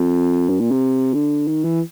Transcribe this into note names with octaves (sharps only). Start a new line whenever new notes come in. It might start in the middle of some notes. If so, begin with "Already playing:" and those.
Already playing: F2
F#2
A#2
C3
D3
D#3
E3